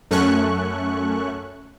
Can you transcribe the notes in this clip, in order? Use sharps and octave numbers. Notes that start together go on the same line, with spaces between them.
F#2 A3 C#4 C#6 F#6